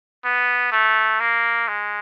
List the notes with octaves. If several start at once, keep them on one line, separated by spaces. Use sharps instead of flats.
B3
A3
A#3
G#3